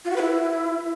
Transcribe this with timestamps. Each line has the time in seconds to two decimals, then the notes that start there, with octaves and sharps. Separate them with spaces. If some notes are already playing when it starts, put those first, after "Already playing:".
0.05 F4
0.10 F#4
0.16 B4
0.22 E4